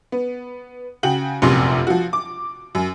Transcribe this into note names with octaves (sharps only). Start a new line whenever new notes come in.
B3
C#3 F#4 G5 F#7
F1 A#1 F#2 C3 C6
F3 F#4
D6
F#2